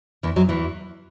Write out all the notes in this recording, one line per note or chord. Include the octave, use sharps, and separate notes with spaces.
E2 E3
F#2 F#3
E2 E3